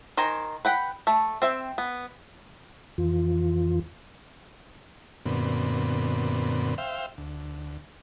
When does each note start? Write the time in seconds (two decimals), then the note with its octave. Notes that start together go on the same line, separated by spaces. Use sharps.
0.17 D#3 C5 G#5 A#5
0.65 B4 F#5 G5 B5
1.07 A3
1.42 C4 E5 G5
1.78 B3
2.98 F2 E3 F4
5.26 F#2 A#2 D3 B3 C4
6.78 C5 E5 F5 G5
7.18 D2